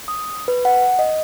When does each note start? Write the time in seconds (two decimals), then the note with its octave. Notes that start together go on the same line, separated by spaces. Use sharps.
0.08 D#6
0.48 B4
0.65 F#5
0.99 D#5